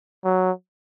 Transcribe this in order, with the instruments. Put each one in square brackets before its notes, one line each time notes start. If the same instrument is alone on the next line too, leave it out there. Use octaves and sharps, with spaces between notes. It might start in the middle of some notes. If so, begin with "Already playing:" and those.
[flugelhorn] F#3